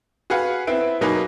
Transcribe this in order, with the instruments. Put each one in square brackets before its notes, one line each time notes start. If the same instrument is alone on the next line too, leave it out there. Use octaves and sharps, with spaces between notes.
[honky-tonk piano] F#4 G#4 B4 F5 F#5
B3 C4 E4 B4 D7
B2 F#3 A#3 D#4 G#4 B4